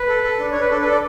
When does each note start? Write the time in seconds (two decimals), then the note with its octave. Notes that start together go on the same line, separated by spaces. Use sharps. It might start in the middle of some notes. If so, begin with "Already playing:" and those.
Already playing: B4
0.08 A4
0.24 A4
0.39 D4
0.52 D4 C#5
0.61 B4
0.70 D4 A4
0.81 B4
0.86 A4
0.91 D5